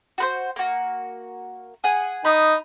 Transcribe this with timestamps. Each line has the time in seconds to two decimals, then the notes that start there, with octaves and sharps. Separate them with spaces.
0.18 F#4 B4 C5
0.56 A#3 F#4
1.84 G#4 F#5 G#5
2.25 D#4 B5 D#6